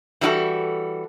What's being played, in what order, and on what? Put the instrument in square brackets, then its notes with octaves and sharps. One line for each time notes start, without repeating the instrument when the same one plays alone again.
[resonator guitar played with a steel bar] E3 G3 D#4 F#4 A4